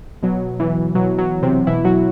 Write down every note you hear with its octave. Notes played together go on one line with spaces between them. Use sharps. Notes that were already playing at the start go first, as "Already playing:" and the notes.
B2 F#3
E3
B2 F#3
F#3
C3 C4
B2 E3 E4
F#3 F#4